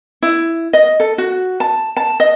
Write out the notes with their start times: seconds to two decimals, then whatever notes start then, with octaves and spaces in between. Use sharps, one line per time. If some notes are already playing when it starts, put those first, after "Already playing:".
0.23 E4
0.73 D#5
1.00 A4
1.18 F#4
1.60 A5
1.97 A5
2.20 D#5